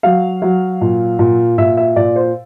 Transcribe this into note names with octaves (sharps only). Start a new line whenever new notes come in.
F#3 F5
F#3
A#2
A#2
A#2 E5
E5
A#2 D5
C5